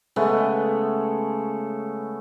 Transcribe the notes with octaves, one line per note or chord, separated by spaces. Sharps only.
C#3 G#3 A3 B3